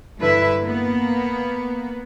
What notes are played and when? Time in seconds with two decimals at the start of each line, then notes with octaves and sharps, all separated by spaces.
0.19 G2 D3 E4 B4 E5
0.63 A#3 B3